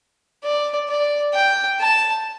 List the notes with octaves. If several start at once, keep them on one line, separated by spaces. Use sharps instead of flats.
D5
D5
G5
A5